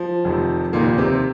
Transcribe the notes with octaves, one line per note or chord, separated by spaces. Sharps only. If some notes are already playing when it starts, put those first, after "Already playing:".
Already playing: F3
F1 F2 C3 D#3
F1 D#2 A#2 D#3 A#3
C3 C4